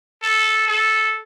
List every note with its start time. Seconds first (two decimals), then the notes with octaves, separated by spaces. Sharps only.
0.23 A4
0.68 A4